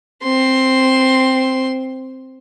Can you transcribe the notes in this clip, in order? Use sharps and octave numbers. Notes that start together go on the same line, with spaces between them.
C4 C6